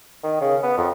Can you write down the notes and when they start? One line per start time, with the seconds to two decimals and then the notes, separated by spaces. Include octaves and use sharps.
0.24 D#3
0.41 C#3
0.63 B3
0.78 F2